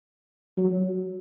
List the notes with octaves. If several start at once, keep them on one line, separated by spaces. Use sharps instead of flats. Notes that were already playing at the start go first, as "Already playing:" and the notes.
F#3